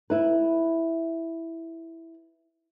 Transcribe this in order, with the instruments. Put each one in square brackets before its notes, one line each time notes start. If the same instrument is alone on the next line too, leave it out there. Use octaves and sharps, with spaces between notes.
[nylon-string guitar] E4 B4